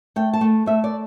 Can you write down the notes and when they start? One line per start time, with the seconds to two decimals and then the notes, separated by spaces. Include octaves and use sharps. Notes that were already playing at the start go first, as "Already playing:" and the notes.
0.16 A3 G5
0.33 A5
0.41 A3
0.66 A3 E5
0.84 D5